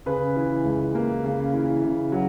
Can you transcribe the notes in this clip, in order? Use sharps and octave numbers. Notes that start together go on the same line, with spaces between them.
C#3 G#4 B4
E3
C#2
A#3
C#3
E3
C#3
F#3